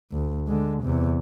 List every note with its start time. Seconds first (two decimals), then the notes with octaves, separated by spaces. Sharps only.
0.12 D2
0.48 D3 G#3
0.83 E2 C3